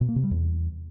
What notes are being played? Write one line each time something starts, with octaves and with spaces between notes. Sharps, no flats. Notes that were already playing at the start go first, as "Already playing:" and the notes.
B2
A#3
C3
G3
E2